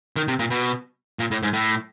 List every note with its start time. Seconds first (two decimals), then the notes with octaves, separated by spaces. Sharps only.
0.16 D#3
0.28 C3
0.39 A#2
0.50 B2
1.19 A#2
1.31 A2
1.43 G#2
1.53 A2